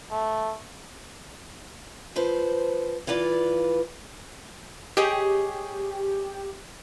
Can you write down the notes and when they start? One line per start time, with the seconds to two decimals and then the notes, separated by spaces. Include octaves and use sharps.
0.11 A3
2.16 F3 B4 C5
3.07 E3 F4 B4 D5
4.97 G4 G#4 C#5 D#5